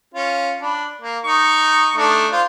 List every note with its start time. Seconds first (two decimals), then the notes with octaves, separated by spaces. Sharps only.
0.14 C#4 F4
0.61 D4 B5
1.02 A#3
1.24 D#4 C#6
1.97 A3 D4 D#4
2.32 F4 C5